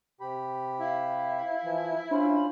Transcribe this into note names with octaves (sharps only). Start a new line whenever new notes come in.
C3 G4 B5
E4 F5
E3 F3
C#4 D4 F4 C5 B5